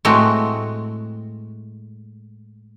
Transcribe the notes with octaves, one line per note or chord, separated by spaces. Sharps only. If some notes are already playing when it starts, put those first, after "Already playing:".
A2 G#3 A3 C4 F#4